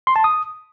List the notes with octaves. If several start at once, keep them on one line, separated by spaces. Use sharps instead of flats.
C6
A5
D#6